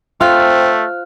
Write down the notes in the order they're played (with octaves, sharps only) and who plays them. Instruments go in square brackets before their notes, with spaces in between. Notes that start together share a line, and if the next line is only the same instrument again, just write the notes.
[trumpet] A3 [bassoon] C4 [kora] F4 [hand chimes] C5 F6 F#6